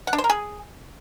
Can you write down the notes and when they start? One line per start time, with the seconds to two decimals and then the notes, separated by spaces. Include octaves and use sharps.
0.07 F#5
0.13 D4
0.18 C5
0.24 A#4
0.30 G#4